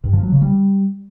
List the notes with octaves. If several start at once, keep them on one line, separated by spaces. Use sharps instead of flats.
G2
F3
F#3
C#3
G3